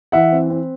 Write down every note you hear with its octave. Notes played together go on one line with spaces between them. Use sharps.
E3 E5 F#5
C4
C4